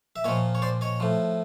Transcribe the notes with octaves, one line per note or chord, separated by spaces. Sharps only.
E5
A#2 F3 C#5 D#5
C#5
C5 D5
C#5 D#5
A2 F3